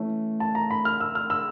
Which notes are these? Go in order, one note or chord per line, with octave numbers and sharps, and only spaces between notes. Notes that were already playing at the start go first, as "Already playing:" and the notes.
Already playing: E3 A3 C#4
A5
A#5
B5
F6
E6
F6
E6